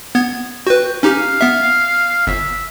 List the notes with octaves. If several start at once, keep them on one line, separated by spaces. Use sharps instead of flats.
B3 G#6
F#4 B4 G5
C#4 D#4 G4 F5
B3 E5
G1 E5